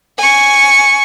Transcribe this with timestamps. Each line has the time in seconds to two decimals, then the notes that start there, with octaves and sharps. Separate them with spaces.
0.18 G#5 C#6